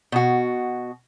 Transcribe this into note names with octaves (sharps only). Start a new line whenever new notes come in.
B2 F#4